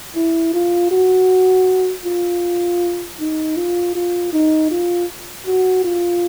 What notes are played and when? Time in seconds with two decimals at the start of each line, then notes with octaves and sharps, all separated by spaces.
0.16 E4
0.53 F4
0.91 F#4
2.05 F4
3.20 D#4
3.57 F4
3.95 F4
4.33 D#4
4.71 F4
5.47 F#4
5.84 F4